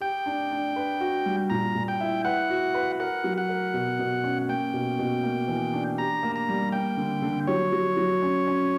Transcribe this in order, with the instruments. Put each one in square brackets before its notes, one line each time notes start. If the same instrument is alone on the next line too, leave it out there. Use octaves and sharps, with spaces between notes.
[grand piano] G4 [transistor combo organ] G5
[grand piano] D4
D4
B4
F#4
G3
[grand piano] A#2 [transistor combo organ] A#5
[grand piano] A#2
[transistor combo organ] G5
[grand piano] E4
[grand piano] B4 [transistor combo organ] F#5
[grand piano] F#4
B4
[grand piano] A#4 [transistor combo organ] F#5
[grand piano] F#3
[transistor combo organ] F#5
[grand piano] A#4
B2
B2
C#4
[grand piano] A#3 [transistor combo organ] G5
[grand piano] B2
B2
A#3
E3
D4
[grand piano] G4 [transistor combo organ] A#5
[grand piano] A#3
[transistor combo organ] A#5
[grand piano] G3
[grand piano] A#3 [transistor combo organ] G5
[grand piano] D3
D3
[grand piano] F#3 [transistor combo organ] C#5
[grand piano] F#3
F#3
C#4
C#4